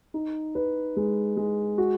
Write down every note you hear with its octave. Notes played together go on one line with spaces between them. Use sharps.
D#4
B4
G#3
G#3
F#4